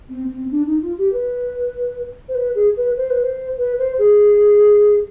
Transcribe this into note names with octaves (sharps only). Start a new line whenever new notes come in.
C4
C4
D4
D#4
F4
G4
B4
C5
B4
G#4
B4
C5
B4
C5
B4
C5
G#4